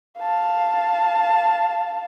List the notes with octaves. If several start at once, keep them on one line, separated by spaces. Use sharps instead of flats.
F5 A5